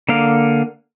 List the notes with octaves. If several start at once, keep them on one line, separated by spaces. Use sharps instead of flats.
D3 A#3 F5